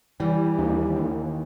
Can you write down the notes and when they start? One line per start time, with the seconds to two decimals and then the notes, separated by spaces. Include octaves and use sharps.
0.20 E3 G3
0.58 D#2
0.96 D#2